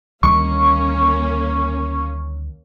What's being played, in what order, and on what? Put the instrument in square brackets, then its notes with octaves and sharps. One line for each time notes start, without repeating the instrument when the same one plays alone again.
[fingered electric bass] D2 D#3 G3 [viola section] A#3 C#4 [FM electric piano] C#6